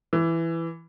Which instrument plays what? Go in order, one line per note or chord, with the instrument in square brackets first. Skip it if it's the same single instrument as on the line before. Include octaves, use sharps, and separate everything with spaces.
[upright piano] E3